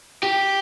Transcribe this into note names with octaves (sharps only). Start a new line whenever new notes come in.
G4